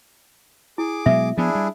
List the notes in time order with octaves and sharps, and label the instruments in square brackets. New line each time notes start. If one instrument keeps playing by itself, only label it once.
[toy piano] E4 [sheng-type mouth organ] G#4 D6
[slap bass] B2 F#3 G#3 [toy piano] E5
[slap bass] F3 B3 [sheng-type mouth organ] D4 E4 G#4
[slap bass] G3